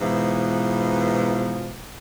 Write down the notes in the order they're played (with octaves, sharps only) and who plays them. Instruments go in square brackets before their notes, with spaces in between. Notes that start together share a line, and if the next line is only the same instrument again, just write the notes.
[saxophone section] G#2 B2 E3 F3